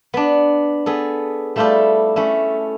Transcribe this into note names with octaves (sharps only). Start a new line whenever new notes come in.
B3 D4
B3 G#4 A4
G3 A3 E4 F4 G4 A4
A3 C#4 E4